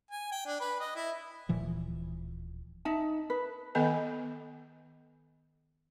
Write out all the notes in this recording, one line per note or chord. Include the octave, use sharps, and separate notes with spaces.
G#5
G5
D4
B4
D#5
E4
D1 A#2 E3 F3
D#4 E5 A5
B4
D#3 B3 A4 D#5 G#5